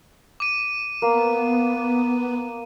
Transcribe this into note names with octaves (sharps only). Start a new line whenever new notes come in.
D6 D#7
A#3 B3